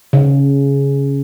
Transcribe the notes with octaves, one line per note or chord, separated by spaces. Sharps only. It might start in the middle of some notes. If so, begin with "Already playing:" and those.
C#3